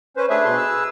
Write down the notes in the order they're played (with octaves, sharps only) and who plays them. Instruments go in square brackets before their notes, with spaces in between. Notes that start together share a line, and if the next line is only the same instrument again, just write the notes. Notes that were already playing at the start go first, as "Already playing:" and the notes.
[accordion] C#4 B4 C5
[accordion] A3 D4 E5 [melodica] G#4 B4
[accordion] B2 C6
E6